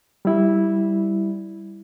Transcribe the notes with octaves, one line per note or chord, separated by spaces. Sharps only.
G3 E4